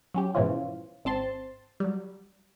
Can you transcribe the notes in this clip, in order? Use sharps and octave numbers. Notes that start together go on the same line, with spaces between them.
F#3 C#4 G4
G#2 B2 E3 F3 C#4 F4
G#1 C4 A5 C6
F#3 G3